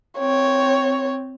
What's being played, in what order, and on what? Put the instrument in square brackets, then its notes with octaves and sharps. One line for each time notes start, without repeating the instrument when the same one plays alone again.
[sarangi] C4 [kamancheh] C#5